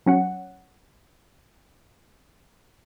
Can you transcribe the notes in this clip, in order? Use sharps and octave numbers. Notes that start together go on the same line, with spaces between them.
F#3 C#4 F#5